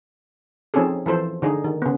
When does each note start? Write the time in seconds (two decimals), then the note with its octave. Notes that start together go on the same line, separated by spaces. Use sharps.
0.74 F3 C4 C#4 D#4 G#4 A4
1.06 E3 F3 A4 C5
1.42 D3 D#4 G#4
1.64 D#3
1.82 C#3 B3